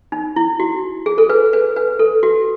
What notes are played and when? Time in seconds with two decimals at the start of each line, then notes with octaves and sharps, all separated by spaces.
0.12 D#4
0.36 E4
0.60 F#4
1.06 G#4
1.18 A4
1.29 B4
1.53 B4
1.76 B4
1.99 A4
2.23 F#4